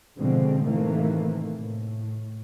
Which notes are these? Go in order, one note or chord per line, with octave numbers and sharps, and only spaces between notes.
B2 D3 F3 G#3 C4
A2 C3 D#3 E3 A3 A#3
A2